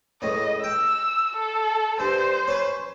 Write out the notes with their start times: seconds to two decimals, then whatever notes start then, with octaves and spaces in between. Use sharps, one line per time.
0.22 C#2 A2 D#5
0.64 G5 E6
1.37 A4
2.00 G2 C5
2.48 C#4 B4